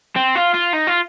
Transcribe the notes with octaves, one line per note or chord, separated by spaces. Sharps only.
C4
F4
F4
D#4
F4